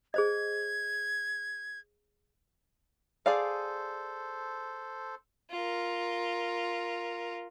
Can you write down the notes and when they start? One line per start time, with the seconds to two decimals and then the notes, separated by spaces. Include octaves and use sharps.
0.14 G#4 C5 D#5 G#6
3.26 G#4 A4 C5 D5 F5
5.51 F4 A#4